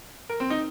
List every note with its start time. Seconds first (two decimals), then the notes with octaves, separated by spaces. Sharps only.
0.29 A#4
0.40 C4
0.50 D#4